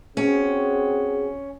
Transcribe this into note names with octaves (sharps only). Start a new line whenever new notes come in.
C4 C#4 F#4 G#4